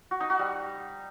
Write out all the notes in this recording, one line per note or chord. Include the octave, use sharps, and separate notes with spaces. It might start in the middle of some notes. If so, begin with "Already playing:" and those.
F#4
D#4
F#4
G3